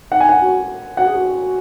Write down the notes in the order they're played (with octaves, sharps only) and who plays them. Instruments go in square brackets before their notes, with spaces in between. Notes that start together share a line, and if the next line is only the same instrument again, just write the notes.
[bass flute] D#4 [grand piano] F#5
[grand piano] G#5
F#5
[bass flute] F#4
[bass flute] F#4 [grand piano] F#5
[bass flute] G#4
F#4